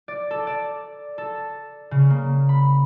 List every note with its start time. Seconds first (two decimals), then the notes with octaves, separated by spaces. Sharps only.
0.08 D5
0.31 A4
0.47 D5
1.18 A4
1.91 C#3
2.10 A#3
2.49 B5